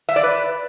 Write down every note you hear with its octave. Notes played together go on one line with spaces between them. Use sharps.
E5
D5
B4